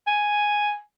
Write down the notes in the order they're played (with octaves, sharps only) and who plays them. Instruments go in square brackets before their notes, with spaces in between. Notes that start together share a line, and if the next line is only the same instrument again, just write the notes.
[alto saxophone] G#5